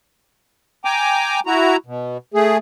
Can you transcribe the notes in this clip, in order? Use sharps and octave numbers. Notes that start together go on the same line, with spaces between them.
G5 G#5 A#5 D6
E4 F#4 A#5
B2
A3 G#4